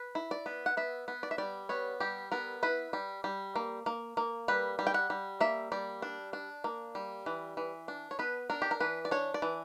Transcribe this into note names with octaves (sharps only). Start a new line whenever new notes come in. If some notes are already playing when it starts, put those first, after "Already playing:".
Already playing: B4
E4
D5
B3
F#5
B3 E5
B3
D5
E5
G3 D5
B3 C#5
G3 G4
B3 A#4
E4 B4
G3
G3
A#3
A#3
A#3
G3 B4
G3
G5
F#5
G3
A#3 E5
G3 D5
D4
D4
A#3
G3
E3
E3
D4
C#5
B3 B4
D4 A#4
G4
A#4
E3 B4
D5
D4 C#5
D5
E3